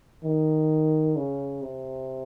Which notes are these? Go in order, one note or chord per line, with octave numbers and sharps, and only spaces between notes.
D#3
C#3
C3